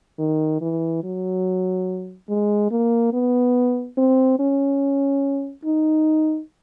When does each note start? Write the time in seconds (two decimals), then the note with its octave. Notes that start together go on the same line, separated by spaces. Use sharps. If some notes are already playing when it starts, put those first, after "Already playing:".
0.19 D#3
0.61 E3
1.03 F#3
2.29 G#3
2.71 A#3
3.13 B3
3.97 C4
4.39 C#4
5.65 D#4